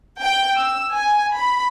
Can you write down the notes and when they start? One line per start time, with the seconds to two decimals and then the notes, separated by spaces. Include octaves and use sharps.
0.21 G5
0.57 E6
0.93 G#5
1.35 B5